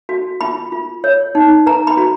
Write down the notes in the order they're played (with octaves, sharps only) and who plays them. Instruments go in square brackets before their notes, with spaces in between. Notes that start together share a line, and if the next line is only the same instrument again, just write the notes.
[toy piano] F#4
F4 B5
F4
C#5
D#4
B4 A#5
B5
F#4